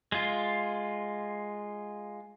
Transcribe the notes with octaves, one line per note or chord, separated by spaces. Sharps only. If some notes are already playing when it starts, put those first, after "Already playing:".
G#3 F4